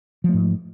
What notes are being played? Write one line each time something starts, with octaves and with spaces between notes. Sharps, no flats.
G#2 F3 A3